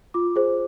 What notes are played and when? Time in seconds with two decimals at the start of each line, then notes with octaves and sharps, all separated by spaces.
0.14 F4 D6
0.36 G#4 C5